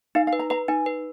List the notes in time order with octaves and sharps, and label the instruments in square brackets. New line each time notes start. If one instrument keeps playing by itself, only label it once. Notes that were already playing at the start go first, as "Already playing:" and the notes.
[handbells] D#4 [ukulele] F5
[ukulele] F5
[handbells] B4
[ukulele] A#5
[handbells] B4 [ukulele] A#5
[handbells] D#4 [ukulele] G#5
[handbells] B4